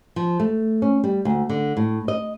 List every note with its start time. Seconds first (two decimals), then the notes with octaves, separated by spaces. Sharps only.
0.16 F3
0.40 A3
0.82 C#4
1.04 G3
1.25 D2
1.50 D3
1.77 A2
2.08 D#5